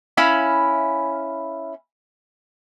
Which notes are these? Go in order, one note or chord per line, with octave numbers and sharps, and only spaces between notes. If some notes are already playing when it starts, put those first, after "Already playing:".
C#4 E4 F5 B5